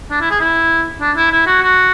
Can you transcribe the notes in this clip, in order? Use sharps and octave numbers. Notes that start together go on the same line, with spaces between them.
D4
E4
G#4
E4
D4
E4
E4
F#4
F#4